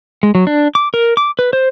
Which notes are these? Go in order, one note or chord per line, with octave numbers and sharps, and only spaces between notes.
G#3
F#3
D4
D6
A#4
D6
B4
C5